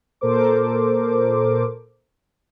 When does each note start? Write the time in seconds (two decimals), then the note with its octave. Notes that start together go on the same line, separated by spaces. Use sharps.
0.21 A#2 A4 A#4 C5 D6